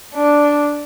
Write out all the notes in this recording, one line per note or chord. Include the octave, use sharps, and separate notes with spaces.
D4